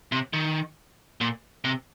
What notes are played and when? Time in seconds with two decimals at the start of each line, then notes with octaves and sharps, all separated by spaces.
0.12 C3
0.33 D#3
1.21 A#2
1.65 C3